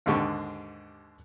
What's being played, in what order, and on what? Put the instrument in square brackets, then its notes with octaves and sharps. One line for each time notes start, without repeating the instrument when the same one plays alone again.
[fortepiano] D#2 G#2 D3 G4 C#6